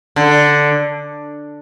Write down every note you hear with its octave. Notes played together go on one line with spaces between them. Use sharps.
D3